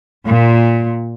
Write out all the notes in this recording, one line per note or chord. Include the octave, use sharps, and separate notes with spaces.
A#2